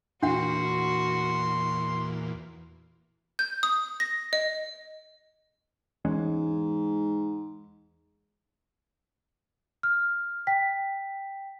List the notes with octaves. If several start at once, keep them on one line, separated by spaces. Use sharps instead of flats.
E2 A#2 D4 F#4 F#5 C6
G6
D#6
A#6
D#5
E2 G#2 G#3 C#4
F6
G5 B6